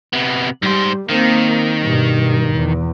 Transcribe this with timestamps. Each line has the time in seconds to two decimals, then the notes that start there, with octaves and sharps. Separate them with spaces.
0.13 C3 B3
0.63 G#2 G3 C5
1.10 D#3 A#3 C4
1.83 G2 B2
2.55 E2